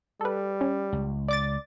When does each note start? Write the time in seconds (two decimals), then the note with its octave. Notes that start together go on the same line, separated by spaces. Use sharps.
0.21 G3 A4 B4
0.61 C#4
0.93 C#2
1.28 D5 D6 A6